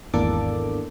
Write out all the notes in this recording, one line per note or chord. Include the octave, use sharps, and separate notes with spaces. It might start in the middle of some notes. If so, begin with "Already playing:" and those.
G#1 E2 A#3 D4 A4 D6